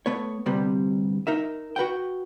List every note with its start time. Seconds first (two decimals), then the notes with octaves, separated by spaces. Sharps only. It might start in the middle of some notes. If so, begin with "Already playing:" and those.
0.06 A3 B3 C#5
0.46 D2 G2 C3 G3 B3 C4
1.27 D#4 A#4 E5
1.76 F#4 B4 F#5 G5